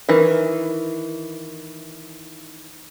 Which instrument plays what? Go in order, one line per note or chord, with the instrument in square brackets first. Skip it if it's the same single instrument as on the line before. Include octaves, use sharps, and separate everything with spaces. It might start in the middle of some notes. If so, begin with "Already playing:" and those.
[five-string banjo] D#3 E3